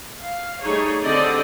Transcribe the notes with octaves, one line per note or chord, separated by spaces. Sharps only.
F5
G3 A3 D#4 G#4 C#5
D3 C4 G4 D5 D#5